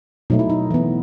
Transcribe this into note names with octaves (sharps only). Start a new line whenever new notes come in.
B2 F#3 A3 D#4
E4
D#4
E3 B3